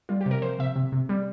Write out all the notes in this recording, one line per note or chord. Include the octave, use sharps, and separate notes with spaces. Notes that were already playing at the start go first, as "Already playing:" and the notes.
G3 F4
G4
C3 A#4
F3 C5
C3 E5
C3
C3
G3